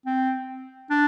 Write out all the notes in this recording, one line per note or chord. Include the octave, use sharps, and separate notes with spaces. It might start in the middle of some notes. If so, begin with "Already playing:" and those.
C4
D4